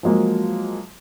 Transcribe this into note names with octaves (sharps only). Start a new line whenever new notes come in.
F3 F#3 G#3 A#3